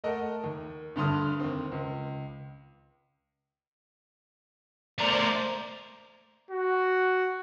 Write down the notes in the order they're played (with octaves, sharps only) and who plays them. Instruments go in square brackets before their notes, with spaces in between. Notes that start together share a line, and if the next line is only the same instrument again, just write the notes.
[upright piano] A3 A4 A#4 D#5 F#5
D#2
D2 G2 D3 C6 D#6 F6
D#2 C4
C#2
[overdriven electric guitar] A3 A#4 [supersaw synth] C5 D5
[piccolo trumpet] F#4